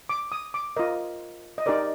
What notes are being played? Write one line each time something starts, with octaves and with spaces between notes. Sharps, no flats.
D6
D#6
D6
F4 A#4 D#5
D#5
D#4 G4 A#4 D5